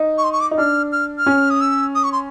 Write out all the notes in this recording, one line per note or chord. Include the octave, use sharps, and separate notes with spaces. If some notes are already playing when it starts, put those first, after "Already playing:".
Already playing: D#4
C#6
C6
C#6
D6
D#4
D4 F6
F6
F6
C#4
D#6
E6
D#6
C#6
C6